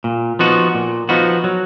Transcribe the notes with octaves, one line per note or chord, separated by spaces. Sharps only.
A#2
F3 B3 D#4 F#4
A#2
F3 B3 D#4 F#4
F#3